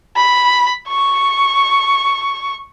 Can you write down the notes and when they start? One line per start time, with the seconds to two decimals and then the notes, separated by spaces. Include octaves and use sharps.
0.16 B5
0.88 C#6